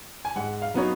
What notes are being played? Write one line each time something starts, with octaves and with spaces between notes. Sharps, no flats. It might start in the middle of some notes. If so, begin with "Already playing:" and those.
G#5
G#2 F#5
F5
F#3 B3 D#4 C#5